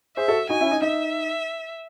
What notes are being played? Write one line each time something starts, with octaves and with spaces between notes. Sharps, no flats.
G#4 C5 E5
F#4 A4
D#4 F#4 G#5
C#4 E4
D#4
D#4 E5